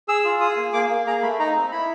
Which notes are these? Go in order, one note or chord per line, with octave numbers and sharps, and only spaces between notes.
G#4 E6
F4
G#4 D#6
A#3
A#3 D6
A#3
G#4 A#5
A3 B5
D#4 A#5
C4
E4 B5